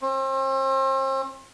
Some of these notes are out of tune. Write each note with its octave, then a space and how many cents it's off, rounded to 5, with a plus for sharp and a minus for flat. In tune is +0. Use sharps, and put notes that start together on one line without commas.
C4 +40